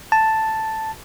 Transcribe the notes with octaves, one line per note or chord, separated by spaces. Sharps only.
A5